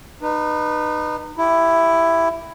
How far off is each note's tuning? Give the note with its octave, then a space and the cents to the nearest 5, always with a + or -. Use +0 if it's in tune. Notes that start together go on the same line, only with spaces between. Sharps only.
D#4 -30 B4 -10
E4 +10 G4 +0